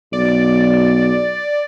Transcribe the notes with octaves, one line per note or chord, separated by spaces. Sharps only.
B1 D5